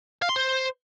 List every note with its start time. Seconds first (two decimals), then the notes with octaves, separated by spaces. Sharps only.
0.22 F5
0.29 C6
0.36 C5